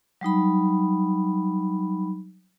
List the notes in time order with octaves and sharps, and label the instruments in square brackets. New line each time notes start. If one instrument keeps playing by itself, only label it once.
[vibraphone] F#3 G3 D#4 B5